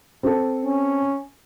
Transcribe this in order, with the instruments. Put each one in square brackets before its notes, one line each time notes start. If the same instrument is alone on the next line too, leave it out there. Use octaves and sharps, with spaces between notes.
[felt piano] C4 A4
[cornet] C#4